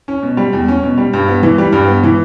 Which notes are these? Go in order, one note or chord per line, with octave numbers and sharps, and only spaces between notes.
C#4
B2
G3
E2
C#4
B2
G3
G2
B3
E3
G3
G2
B3
E3